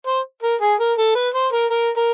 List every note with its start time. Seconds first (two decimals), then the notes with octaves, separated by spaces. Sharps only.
0.07 C5
0.43 A#4
0.61 G#4
0.80 A#4
0.98 A4
1.15 B4
1.34 C5
1.53 A#4
1.71 A#4
1.97 A#4